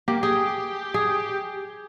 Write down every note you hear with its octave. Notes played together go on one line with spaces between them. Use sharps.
A#3 G4
G4 G#4
G#4